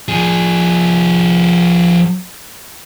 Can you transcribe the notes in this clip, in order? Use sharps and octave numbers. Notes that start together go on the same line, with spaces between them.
F3 G#4